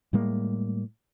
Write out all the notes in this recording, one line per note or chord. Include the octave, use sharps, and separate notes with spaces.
A2 G3 G#3 A#3